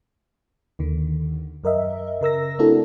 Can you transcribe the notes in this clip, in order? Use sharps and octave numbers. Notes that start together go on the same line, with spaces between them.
D#2 D3 D#3
F#2 A#4 D#5 E5
C#3 A#4 E6 A#6
A3 C4 D4 E4 F#4 A4